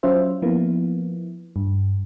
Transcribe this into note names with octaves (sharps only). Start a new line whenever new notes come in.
F#3 C#4 F4 C5 E5
F3 A#3 B3 E4
G2